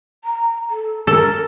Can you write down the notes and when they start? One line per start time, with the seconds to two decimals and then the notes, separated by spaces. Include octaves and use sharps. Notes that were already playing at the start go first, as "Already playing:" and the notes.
0.24 A#5
0.70 A4
1.07 A4 A#4